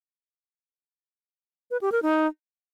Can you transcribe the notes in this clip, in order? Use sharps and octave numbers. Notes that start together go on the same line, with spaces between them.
B4
G4
A#4
D#4